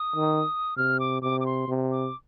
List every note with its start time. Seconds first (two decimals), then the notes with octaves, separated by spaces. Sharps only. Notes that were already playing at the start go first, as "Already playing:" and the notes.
Already playing: D#6
0.16 D#3
0.77 C3 F6
1.00 D6
1.22 C3 D6
1.40 D6
1.46 C6
1.68 C3
1.91 D6